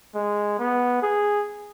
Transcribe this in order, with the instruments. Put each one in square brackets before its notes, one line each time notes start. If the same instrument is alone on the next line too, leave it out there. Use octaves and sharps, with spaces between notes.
[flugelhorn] G#3
B3
G#4